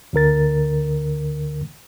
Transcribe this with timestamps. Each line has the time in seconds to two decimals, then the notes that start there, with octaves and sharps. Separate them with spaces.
0.13 D2 D3 A#4 A6